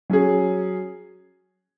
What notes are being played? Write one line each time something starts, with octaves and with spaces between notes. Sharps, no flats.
F#3 C#4 G#4